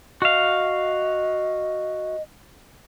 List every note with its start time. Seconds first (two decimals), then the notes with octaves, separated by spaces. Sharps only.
0.22 F#4 D#5 F5